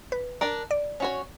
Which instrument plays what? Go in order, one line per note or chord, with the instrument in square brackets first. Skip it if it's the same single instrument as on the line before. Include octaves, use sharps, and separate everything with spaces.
[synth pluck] B4
[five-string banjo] D4 A#4 D5
[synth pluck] D5
[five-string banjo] C#4 F#4 C#5